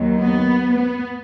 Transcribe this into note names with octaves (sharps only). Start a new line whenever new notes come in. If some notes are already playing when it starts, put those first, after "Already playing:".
Already playing: D#2 D#3 F#3
B3
B3